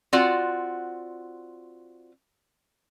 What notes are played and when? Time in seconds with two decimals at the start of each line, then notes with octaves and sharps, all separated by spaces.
0.13 C4 F4 F#4 D5 F#5